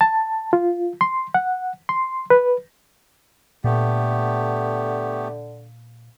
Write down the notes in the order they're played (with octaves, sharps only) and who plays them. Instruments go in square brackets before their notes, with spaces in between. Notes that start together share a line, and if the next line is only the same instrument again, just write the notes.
[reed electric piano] A5
F4
C6
F#5
C6
B4
[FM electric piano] A#2 [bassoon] D3 [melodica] A3 B3 G4